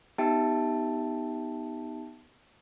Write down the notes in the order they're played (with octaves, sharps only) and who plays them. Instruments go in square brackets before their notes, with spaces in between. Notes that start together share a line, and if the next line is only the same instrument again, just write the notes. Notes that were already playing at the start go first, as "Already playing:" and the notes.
[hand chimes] B3 D#4 G4 E5 G5 A5